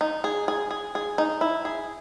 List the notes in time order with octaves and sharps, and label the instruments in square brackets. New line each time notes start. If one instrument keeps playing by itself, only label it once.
[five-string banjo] D#4
G#4
G#4
G#4
G#4
D#4
E4
G#4